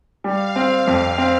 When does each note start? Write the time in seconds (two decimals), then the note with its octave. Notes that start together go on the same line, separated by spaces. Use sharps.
0.24 G3 F5
0.56 C4
0.87 F2
1.18 C4